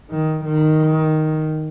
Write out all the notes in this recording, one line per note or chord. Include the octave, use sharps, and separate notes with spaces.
D#3
D#3